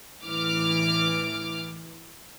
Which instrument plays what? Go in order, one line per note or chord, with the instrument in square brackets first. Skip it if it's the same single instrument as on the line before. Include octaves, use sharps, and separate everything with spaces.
[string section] A2 E3 D6 F6